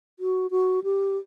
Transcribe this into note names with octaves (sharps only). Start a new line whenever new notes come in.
F#4
F#4
G4